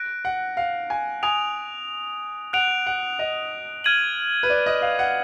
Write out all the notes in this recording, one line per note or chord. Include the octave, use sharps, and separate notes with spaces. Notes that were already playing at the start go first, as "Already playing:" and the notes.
Already playing: F#6 A#6 D7
F#5
F5
G#5
G#5 D#6 F#6 D7 F7
F#5 F#6 D7 F7
F#5
D#5
F6 G#6 D#7 F#7
B4
D5
D#5
F5
F#5